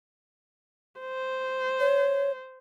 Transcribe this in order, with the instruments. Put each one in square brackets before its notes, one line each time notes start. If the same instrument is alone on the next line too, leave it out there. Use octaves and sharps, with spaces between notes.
[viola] C5
[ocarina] C#5